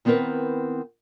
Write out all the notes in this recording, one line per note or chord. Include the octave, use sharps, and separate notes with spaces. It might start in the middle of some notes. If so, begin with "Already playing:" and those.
D#3 B3 C4 E4 A#4 B4